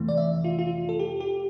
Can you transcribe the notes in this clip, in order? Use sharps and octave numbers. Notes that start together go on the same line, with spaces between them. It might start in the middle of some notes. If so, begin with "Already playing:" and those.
Already playing: F2 C3 E3 A3
D5
E5
F4
F4
A4
G4
G4